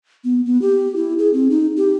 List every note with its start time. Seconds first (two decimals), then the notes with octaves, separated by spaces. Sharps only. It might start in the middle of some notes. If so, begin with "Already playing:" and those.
0.24 B3
0.46 B3
0.62 G4
0.96 E4
1.19 G#4
1.33 C4
1.50 D#4
1.77 G4